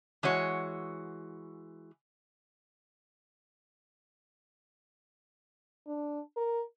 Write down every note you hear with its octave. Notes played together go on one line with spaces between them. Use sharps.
E3 G#3 F#4 C#5
D4
A#4